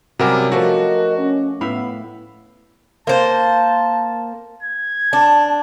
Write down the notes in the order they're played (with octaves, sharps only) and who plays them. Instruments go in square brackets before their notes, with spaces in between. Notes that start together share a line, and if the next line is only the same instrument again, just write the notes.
[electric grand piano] C3 A#4 D6 [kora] F#3 G3 C#4
[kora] F3 A3 F4 [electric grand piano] F#4 [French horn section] A#4 D#5
[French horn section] C#4
[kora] A2 E5 F5 [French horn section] B3 [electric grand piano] B5
[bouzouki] A#3 C5 [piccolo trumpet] A5
[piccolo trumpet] G#6
[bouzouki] D4 [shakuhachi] A5